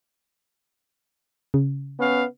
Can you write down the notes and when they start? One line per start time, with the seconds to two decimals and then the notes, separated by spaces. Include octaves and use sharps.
1.54 C#3
2.00 B3 C#4 F5